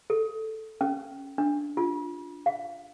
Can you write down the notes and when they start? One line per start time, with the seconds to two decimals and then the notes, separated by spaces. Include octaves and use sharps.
0.10 A4
0.81 C#4
1.38 D4
1.77 F4
2.46 F5